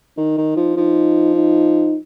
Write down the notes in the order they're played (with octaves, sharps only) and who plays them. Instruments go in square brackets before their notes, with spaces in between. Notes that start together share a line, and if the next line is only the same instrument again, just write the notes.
[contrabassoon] D#3 [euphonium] D#4
[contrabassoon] D#3
F3
[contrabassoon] F3 [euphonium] D#4
[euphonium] D#4